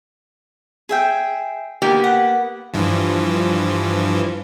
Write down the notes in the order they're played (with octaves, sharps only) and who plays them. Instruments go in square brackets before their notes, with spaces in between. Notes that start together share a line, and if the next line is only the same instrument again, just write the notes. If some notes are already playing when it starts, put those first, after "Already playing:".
[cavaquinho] G#4 E5 G5
[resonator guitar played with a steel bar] A#3 B3 G4
[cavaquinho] F#5
[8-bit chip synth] G2 E3 F3